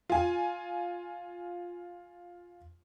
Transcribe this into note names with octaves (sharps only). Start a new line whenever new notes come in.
F4 G#5